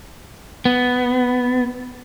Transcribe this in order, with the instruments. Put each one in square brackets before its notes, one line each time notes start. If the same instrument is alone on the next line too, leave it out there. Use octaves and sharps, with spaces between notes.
[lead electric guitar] B3